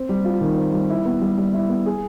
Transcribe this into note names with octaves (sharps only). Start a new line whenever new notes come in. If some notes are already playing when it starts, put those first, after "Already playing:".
Already playing: C4
G3
F4
D#3
C4
G3
E4
B3
G3
G3
E4
B3
G#4